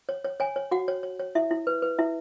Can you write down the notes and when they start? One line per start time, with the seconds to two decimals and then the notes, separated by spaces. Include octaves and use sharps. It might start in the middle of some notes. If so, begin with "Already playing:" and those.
0.09 C#5
0.25 C#5
0.40 C#5 G#5
0.56 C#5
0.71 F#4 F#5
0.88 C#5
1.03 C#5
1.19 C#5
1.35 E4 E5
1.51 E4
1.67 B4
1.82 B4
1.98 E4 E5